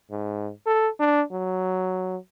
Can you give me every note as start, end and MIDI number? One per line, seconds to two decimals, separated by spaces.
0.11 0.50 44
0.66 0.89 69
1.00 1.22 62
1.32 2.17 54